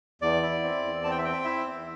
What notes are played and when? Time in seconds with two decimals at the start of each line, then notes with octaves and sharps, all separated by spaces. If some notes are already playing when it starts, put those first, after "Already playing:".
0.22 E2 D5
0.43 E4
0.63 C4
0.84 E2
1.04 C4 A5
1.11 G5
1.18 E5
1.25 C4 G5
1.45 E4 E5
1.65 E2